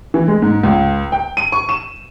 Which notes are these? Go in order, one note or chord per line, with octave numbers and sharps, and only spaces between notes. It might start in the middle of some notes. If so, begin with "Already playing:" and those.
E3
G#3
G#2
C#2
G5
D#7
C#6
E7